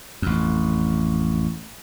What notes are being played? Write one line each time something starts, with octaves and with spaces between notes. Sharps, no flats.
A1 F2